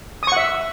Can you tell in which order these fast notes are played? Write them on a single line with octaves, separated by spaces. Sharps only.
D#6 C#6 F#5 E5